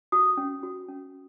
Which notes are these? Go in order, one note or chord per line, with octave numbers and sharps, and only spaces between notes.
F#4 D#6
C#4
F#4
C#4